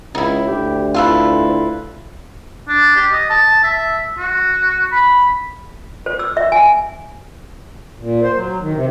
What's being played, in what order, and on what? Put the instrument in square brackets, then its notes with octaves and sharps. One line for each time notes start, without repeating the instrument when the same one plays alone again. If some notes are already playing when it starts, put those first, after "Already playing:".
[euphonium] C#2 [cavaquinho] D#4 E4
[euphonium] D2 [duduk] G4
[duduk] E4 [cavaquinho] F4 A4 B4
[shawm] D4
G4
D#5
A5
E5
F#4
B5
[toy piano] C5
E6
E5
G#5
[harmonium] A#2
C5
F#3
D#3
C3